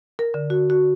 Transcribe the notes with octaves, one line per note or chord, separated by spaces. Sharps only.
A#4
D3
F#4
F#4